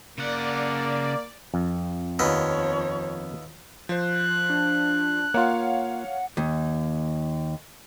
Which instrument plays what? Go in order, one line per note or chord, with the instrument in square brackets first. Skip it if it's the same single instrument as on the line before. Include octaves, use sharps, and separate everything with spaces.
[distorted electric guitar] C#3 F#5 [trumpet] A#3 [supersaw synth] D5
[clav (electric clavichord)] F2
[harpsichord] D#2 B3 [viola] F3 C#5
[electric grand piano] F3 C5 [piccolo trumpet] F#6
[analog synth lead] D4
[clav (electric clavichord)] A#3 F4 [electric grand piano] C#5 F5 [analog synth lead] F#5
[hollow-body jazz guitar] D#2